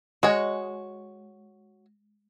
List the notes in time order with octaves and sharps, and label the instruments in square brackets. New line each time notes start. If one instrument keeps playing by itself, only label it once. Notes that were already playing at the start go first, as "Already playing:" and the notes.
[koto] G#3 [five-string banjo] F#4 C#5